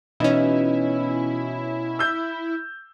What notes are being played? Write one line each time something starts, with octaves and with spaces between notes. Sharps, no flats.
B2 E3 C#4 D#4 E4
E6 G6